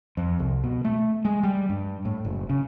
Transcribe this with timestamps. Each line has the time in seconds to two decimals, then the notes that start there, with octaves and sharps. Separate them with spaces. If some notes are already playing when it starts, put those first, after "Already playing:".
0.17 F2
0.39 C2
0.64 B2
0.85 A3
1.25 G#3
1.43 G3
1.69 G2
2.05 A2
2.25 F#1
2.50 C#3